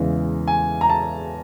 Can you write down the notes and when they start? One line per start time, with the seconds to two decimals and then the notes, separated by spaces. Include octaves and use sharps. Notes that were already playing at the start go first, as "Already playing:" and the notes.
Already playing: E2 C#3 E3 G#3
0.48 G#5
0.81 A#5
0.90 A5